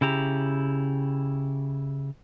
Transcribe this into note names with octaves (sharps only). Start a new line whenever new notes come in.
C#3 E4 G4 A#5